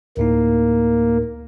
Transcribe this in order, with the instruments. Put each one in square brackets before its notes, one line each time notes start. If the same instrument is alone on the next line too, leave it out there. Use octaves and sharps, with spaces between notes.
[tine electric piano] D2 A2 D#4 [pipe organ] A#3